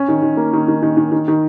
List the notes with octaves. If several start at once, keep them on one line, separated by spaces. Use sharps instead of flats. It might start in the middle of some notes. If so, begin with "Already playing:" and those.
Already playing: C#4
D#3
D#3
A#3
D#3
D#3
D#3
D#3
D#3
D#3